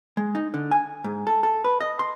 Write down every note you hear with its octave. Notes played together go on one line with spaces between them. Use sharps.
G#3
D#4
D3
G#5
G#2
A4
A4
B4
D#5
C6